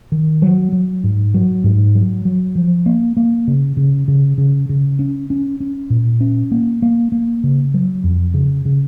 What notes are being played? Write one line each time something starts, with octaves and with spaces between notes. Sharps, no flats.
D#3
F#3
F#3
G#2
F#3
G#2
F#3
F#3
F3
A#3
A#3
C#3
C#3
C#3
C#3
C#3
C#4
C#4
C#4
A#2
C#4
A#3
A#3
A#3
C#3
F#3
F2
C#3
C#3